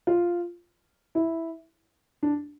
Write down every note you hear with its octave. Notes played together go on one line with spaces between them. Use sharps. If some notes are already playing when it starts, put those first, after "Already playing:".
F4
E4
D4